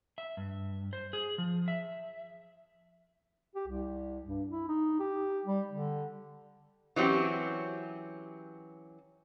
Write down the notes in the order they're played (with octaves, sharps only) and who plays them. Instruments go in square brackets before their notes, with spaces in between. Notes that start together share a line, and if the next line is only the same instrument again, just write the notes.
[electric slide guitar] E5
G2
C5
G#4
F3
E5
[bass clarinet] G4
C2
G2
E4
D#4
G4
G3
D3
[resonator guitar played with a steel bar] E3 F#3 C4 C#4 G4